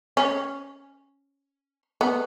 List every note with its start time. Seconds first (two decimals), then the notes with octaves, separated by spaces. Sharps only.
0.17 C#4
2.01 B3